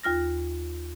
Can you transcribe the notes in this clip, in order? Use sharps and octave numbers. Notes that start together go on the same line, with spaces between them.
D#2 F4 F6 A#6